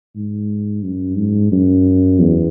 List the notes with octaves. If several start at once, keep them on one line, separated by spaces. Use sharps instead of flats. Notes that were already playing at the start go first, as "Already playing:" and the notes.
G#2
F#2
G#2
F#2
E2